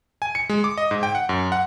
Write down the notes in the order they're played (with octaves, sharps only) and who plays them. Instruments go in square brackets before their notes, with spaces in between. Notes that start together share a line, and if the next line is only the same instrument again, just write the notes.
[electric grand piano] G#5
C#7
G#3
D6
D#5
G#2
G5
F#5
F#2
F#5